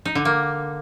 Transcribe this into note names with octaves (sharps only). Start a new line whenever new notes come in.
D#4
D3
A#3